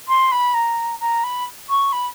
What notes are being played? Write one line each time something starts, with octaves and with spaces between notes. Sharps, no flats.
C6
B5
A#5
A#5
B5
C#6
B5